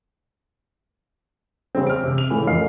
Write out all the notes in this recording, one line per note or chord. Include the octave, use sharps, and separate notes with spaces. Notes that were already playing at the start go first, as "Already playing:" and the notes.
C#3 G3 C4
F6 D7
C3
F7
A2 C#3 E3
A1 F2 A#4 F5 F6 C7